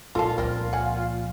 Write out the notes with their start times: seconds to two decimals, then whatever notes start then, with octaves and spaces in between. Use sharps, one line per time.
0.15 A#2 G3 D#4 F4 A4 F5 A5
0.38 C#2 F3 C4 A#4
0.73 F#5 G#5